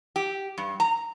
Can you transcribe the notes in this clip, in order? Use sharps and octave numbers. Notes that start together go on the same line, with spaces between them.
G4
G2
A#5